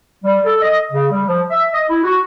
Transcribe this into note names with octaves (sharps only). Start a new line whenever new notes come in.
G3
A4
D#5
C#3
G3
F3
E5
D#5
E4
F#4